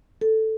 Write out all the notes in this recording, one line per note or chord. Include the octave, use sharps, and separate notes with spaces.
A4